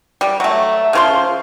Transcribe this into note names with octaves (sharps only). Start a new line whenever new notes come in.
G3
F#3 A3
C#3 F3 C6